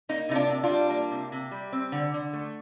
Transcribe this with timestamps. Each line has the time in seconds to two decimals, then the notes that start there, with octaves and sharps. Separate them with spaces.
0.09 A#3 D#4
0.29 C3 D#4
0.35 D4 F4
0.50 C3
0.64 D4 F4
0.70 G3
0.90 A#3
1.11 C3
1.32 C3
1.51 G3
1.73 C4
1.92 D3
2.14 D3
2.33 A3